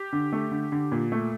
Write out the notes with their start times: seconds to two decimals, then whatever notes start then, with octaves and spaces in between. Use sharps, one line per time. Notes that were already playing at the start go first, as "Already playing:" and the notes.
Already playing: G4
0.12 D3
0.33 A3
0.51 D3
0.72 D3
0.92 A#2
1.12 A3